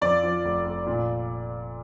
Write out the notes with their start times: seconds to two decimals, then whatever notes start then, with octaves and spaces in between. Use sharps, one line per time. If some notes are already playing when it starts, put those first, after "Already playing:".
0.01 F2 D5
0.24 F3
0.45 F1
0.65 F1
0.86 A#2